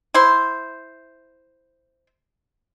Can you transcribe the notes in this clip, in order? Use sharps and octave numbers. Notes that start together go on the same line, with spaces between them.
E4 C5